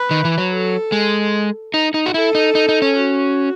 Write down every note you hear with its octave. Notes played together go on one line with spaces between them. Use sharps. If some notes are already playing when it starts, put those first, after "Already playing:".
Already playing: B4
D#3
E3
F#3
A4
G#3
D#4
D#4
F#4
E4 A4
D#4
D#4
D#4
C#4
F#4